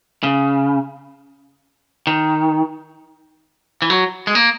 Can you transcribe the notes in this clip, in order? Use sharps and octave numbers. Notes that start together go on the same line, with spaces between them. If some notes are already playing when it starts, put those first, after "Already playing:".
C#3
D#3
E3
F#3
G#3
A#3